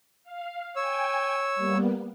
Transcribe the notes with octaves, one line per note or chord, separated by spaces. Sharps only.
F5
C#5 G5 G#5 E6
G3 A#3 B3